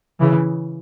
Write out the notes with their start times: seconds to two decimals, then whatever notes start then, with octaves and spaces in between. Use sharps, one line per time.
0.20 C#3 E3